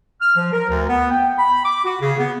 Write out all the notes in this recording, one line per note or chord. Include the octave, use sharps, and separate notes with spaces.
F6
F3
A#4
D2
B3
G5
B5
D6
F#4
C#3
B3